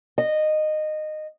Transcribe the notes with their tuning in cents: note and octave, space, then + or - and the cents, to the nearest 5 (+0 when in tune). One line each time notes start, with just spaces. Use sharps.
D#5 -15